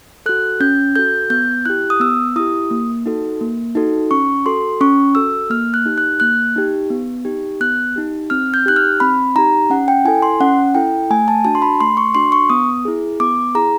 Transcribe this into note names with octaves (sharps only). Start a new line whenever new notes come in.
F#4 A4 F#6
C#4 G6
F#4 A4 G6
B3 G6
E4 G4 F#6
D#6
B3 E6
E4 G4 D#6
A#3
D#4 F#4 A4
A#3
D#4 F#4 A4
C#4 C#6
F#4 A4 C6
C#4 C#6
F#4 A4 E6
A#3 F6
F#6
D#4 G4
F#6
A#3 F#6
D#4 G4
B3
D#4 G4
B3 F#6
D#4 G4
C4 F6
G6
D#4 G4 F#6
F6
C4 B5
D#4 G4 A#5
C#4 F#5
G5
E4 A4 G#5
C6
C#4 F#5
E4 A4 G5
A3 G#5
A5
D4 F#4 A5
C6
B5
A3 C6
C#6
D4 F#4 C6
C#6
B3 D#6
E4 G#4
B3 D6
E4 G#4 A#5